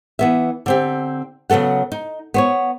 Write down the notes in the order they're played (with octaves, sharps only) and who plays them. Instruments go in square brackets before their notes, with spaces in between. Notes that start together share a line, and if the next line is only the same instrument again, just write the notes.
[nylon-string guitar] E3 B3 E5
D3 C4 G4
C#3 F#3 B3 A4 F#5
D#4
B3 C5 C#5